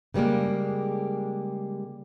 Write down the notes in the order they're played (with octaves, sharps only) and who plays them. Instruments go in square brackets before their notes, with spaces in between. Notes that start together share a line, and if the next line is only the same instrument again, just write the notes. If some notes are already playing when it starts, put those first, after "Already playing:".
[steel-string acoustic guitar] C#3 E3 G3 G#3 A#3